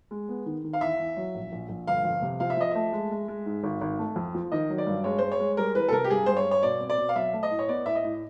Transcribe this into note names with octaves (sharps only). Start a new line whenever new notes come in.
G#3
B3
D#3
D#3
F5
E2 E5
E2
F#3
A#1
A#1
A#1
G1 F5
F2
C3
F3 F5
E5
F3 D#5
A3 E5
G#3
G#3
G#3
G#2
G#1
G#1
A3
F2
F3
D#3 D#5
F#3
D5
G2
G#3 C#5
G#3 C5
C#5
G#3
G3 A#4
E3 B4
A4
C3 A#4
G4
G2 G#4
G2 C5
C#5
G2
C#5
B2 D5
C4
D5
B2
F5
F#3 E5
A3
D#5
A2
C#5
B3 D5
A2 E5
D#5
A2